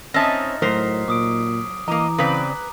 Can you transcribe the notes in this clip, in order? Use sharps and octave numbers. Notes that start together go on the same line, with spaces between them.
C4 C#4 D#4 D#5 E5 A5 D#6 F6
A2 F#3 A#4 C5 D#6 B6 C7
A#2 D6 D#6 D7
E3 A#3 D#5 A#5 D6
C#3 C4 B4 D5 B5